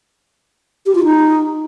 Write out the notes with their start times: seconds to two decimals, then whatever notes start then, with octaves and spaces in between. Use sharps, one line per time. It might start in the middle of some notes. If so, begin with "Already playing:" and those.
0.86 G4
0.95 F4
1.04 D#4